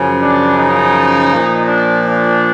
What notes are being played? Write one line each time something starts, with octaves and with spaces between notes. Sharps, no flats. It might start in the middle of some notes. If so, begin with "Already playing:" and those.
Already playing: F#2 C#3 F3
D4
D#4
A#2 F3
D4
D4